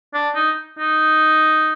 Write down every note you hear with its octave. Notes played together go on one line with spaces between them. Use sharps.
D4
D#4
D#4